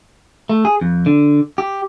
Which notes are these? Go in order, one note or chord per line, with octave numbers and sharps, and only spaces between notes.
A3
G#4
F2
D3
G4